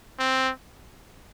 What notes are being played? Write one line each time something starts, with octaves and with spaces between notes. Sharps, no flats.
C4